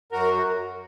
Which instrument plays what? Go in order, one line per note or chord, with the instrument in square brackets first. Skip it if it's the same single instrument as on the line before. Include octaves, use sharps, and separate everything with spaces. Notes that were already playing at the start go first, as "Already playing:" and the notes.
[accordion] F#2 F#4 A#4